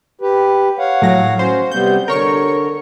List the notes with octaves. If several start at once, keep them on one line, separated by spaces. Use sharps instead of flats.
G4 B4
C#5 F5 F#5
A2 F#3 A#6
C#4 F#4 C5
C3 G3 B3 G6
D3 A#4 C#5 C#6